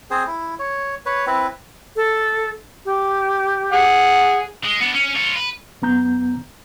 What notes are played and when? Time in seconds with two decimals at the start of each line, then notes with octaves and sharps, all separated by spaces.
0.11 C4 G#4 C5
0.27 E4
0.59 C#5
1.06 B4 C#5
1.27 C4 E4 B4
1.96 A4
2.85 G4
3.72 G#4 F#5
4.64 G#3
4.80 B3 D4
4.94 C#4
5.15 F4 C#5
5.35 B4
5.82 F#2 B3 A#5 G6